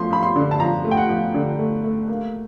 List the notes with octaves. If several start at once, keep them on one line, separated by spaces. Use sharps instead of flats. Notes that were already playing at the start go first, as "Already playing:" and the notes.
Already playing: F3 A3 C6
F3 B5
C6
D3
A5
F3 A#5
A3
G5
F#5
F3
D3
A3
A3
A#3